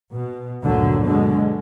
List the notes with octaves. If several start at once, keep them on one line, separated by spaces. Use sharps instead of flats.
B2
G1 D2 A#2 D3 F#3
B2 D3 G#3